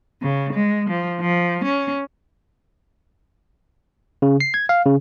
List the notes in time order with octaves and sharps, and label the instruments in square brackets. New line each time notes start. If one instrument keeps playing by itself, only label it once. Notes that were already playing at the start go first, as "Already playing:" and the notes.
[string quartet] C#3
G#3
F3
F3
C#4
[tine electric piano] C#3
C7
G#6
F5
C#3